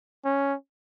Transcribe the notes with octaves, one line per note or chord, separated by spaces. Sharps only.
C#4